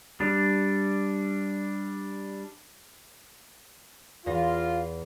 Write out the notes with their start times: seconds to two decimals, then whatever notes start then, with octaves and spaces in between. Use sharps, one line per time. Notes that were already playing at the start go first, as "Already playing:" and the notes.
0.20 G3 D4
4.26 E2 F4 A#6